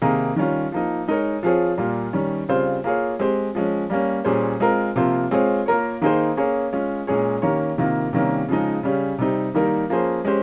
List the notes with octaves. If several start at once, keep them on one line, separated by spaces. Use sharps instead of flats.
C3 D#3 A#3 D#4 G#4
D#3 G3 C#4 F4
F3 A#3 D#4
G#3 D#4 A#4 C#5
F3 C4 F4 G#4 C#5
A#2 G3 A#3 F4
D#3 G3 C#4
C#3 G3 C4 F4 C5
A#3 F4 G#4 C#5
G#3 C4 G4 C5
F3 G#3 C#4
G3 A#3 C#4
A#2 G3 C#4 G#4 C5
G#3 C4 F4 A#4
C3 F3 A#3 F4 C5
G#3 C4 F4 G#4 C#5
A#3 F4 A#4 C#5
D#3 A#3 D#4 G#4 C5
A#3 C#4 G#4 C#5
G#3 C#4 F4
A#2 G#3 C#4 G#4 C#5
D#3 A#3 C#4 G4 C#5
C3 D#3 A#3 F4
C3 D#3 G3 A#3 C#4
C#3 F3 G#3 D#4
C#3 G3 C#4
C3 G3 C4 D#4
D#3 G3 A#3 D#4 A#4
F3 A#3 C#4 G#4 C5
G#3 C#4 G4 C5